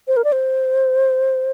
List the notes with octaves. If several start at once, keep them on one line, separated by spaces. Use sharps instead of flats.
C5
A#4
D5
C5